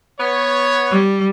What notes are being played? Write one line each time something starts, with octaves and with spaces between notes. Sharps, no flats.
B3 C#5
G3